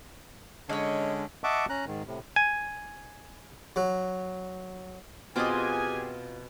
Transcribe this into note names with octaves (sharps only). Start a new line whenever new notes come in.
D3 G#3 C#4 C#5 D#5
D#5 E5 F#5 A5 C#6 D6
C#4 A#5 F#6
G#2 D#3
A2 C3
G#5
F#3
B2 C4 F4 G4 G#4 D#5 G#5 D6